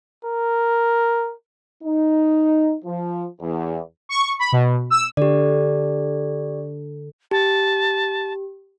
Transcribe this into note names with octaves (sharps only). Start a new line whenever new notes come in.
A#4
D#4
F3
E2
C#6
B5
B2
E6
D3 G4 D5
G4 A5